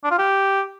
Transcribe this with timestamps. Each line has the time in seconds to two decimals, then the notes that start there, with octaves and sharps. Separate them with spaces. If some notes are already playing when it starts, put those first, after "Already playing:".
0.04 D4
0.11 F4
0.18 G4